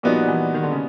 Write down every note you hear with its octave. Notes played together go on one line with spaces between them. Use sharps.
A#2 F3 G3 B3 D#4 F#4
E3
D#3
D3
C#3